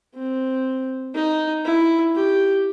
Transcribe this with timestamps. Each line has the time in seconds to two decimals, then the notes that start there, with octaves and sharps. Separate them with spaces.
0.15 C4
1.15 D#4
1.65 E4
2.15 G4